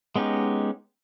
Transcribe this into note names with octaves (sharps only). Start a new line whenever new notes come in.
G#3 B3 C#4 D#4 G4